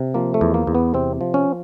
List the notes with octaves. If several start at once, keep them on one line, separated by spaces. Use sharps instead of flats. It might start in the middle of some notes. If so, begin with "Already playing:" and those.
Already playing: C3
F3 A#3
A3
E2
A#3
E2
B3
C3 C4
F3
C#4